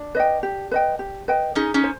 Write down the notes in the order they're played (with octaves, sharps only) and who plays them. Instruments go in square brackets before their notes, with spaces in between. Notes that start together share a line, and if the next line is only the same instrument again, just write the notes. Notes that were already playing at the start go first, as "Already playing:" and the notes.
Already playing: [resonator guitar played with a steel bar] D4
[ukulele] B4 D#5 G5
G4
B4 D#5 G5
G4
B4 D#5 G5
[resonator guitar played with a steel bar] C#4 D#4 [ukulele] G#4
[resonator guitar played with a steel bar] C#4 D#4
[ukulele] C5